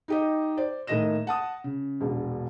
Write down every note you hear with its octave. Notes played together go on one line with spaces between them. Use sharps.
D#4 G4 D#5
C5 D5
A2 D#3 A#3 D#5 A#6 E7
F#5 A5 D#6
C#3
E1 A#1